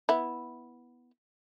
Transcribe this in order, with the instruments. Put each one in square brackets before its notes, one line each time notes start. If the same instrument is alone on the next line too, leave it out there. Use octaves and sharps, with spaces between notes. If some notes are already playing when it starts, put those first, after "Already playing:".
[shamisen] B3 E4